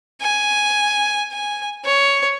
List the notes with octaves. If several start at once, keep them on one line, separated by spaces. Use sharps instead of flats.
G#5
G#5
C#5